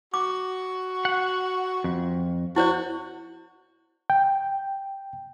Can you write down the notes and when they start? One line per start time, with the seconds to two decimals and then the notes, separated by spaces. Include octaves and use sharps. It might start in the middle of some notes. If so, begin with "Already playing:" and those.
0.14 F#4 D6
1.05 F#5
1.84 F2
2.56 E4 F#4 C5 D5
4.10 G5